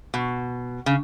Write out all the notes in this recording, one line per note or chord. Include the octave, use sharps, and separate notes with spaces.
B2
C#3